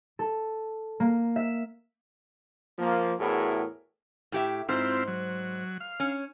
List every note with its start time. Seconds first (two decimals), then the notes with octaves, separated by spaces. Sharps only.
0.19 A4
1.00 A#3
1.36 E5
2.79 F3 A#3
3.20 E2 A2 E4 F#4 G#4 A#4
4.32 A2 G4 E5
4.69 G#2 C4 E4 F4 C5
5.08 F#3
5.80 F5
6.00 C#4